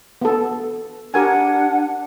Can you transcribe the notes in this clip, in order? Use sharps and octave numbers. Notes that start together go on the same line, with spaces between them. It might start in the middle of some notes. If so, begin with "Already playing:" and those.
B3 A4
D4 G4 A#4 F#5 G#5